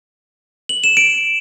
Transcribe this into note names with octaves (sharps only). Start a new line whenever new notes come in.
F#7
E7
D7